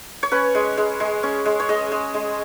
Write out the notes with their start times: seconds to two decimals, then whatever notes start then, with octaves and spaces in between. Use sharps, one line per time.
0.23 C#5
0.32 C#4 B4
0.55 G#3
0.77 G#3
1.00 G#3
1.23 C#4
1.46 G#3
1.60 C#5
1.69 G#3 D#5
1.92 G#3
2.14 G#3